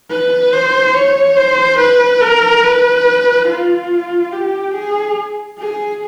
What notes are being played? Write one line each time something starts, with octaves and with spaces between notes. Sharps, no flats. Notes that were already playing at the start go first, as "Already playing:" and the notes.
B4
C5
C#5
C5
B4
A#4
B4
F4
G4
G#4
G#4